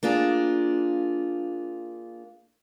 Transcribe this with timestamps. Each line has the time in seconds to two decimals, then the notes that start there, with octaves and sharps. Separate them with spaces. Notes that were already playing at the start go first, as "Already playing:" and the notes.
0.03 A#3 D4 F4 G#4